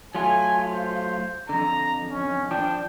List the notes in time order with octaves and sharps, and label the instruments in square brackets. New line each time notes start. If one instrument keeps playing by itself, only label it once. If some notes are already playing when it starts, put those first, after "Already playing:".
[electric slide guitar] F#3 A3 F4 [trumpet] G#5
[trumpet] C5
[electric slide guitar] F2 D3 [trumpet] A#5
[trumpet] C#4
[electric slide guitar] F3 D4 [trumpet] G5